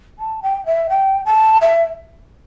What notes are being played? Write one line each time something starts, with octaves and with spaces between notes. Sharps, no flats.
A5
G5
E5
G5
A5
E5